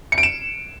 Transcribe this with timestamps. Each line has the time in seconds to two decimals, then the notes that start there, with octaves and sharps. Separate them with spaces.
0.12 C#7
0.18 D7
0.23 E7